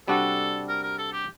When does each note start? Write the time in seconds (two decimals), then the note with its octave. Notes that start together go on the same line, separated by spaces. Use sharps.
0.08 C3 G3 D4 F#4 A4
0.68 A#4
0.83 A#4
0.98 A4
1.12 G4